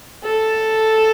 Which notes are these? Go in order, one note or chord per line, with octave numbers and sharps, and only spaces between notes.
A4